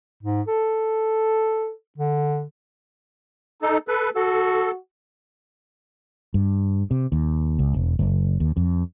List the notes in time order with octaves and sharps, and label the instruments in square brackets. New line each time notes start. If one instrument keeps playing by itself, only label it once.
[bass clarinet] G#2
A4
D3
[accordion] D#4 A4
A4 B4
[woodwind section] F#4 [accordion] A4
[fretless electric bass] G2
C3
D#2
C#2
E1
F#1
D#2
F2